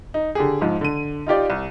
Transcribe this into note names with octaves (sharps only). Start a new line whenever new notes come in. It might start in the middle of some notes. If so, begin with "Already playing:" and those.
D#4
D3 G4 G#4
G#2 F3
D3 D#7
D#4 F4 G4 D5
C2